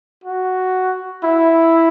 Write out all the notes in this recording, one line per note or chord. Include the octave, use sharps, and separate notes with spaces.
F#4
E4